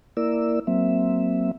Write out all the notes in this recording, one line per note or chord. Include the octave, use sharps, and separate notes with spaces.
A#3 E4 A#4 D5 E6
F#3 A#3 C4 E5